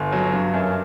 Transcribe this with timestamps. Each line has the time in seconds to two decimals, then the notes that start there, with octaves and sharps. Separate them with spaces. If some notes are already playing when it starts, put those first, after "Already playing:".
Already playing: G1
0.12 F#3
0.33 G2
0.54 F#2